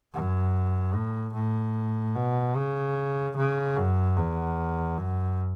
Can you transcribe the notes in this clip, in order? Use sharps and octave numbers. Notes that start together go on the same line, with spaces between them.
F#2
A2
A2
B2
C#3
C#3
F#2
E2
F#2